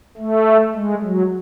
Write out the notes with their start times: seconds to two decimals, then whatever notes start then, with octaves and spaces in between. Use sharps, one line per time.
0.18 A3
0.75 G#3
1.03 F#3